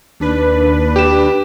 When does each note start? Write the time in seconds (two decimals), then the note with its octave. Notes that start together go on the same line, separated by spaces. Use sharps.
0.20 D#2 D4 B4
0.96 G4 E7